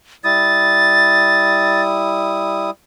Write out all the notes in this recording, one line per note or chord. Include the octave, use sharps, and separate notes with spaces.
G3 E4 D#6 A6